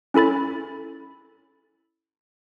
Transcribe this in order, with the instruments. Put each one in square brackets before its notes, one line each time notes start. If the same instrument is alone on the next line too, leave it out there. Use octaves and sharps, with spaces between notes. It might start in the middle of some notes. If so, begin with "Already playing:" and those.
[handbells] C#4 E4 A4 B5 A6